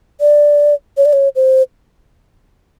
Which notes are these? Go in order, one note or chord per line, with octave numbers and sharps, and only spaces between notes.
D5
C#5
D5
C#5
C5